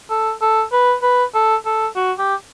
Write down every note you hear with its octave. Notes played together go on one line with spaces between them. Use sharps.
A4
A4
B4
B4
A4
A4
F#4
G4